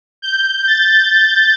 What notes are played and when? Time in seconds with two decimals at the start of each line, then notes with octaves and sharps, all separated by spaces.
0.22 G6
0.67 A6